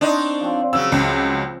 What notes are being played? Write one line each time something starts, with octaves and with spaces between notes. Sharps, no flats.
C4 D4 D#4 C5 C#5
F3 C4
C#3 F#3 E6
C#2